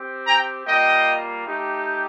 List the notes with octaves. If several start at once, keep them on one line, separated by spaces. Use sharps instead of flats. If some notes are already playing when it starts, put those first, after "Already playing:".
Already playing: C4 G4
G5 A#5
G3 A#3 F4 D#5 G5
A3 D#4 G4